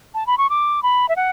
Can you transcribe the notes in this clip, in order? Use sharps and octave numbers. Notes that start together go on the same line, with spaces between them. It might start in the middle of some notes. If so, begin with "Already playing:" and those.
A5
B5
C#6
D6
B5
E5
F#5